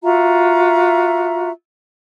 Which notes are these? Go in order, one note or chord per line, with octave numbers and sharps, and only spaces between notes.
F4 F#4 E5 A#5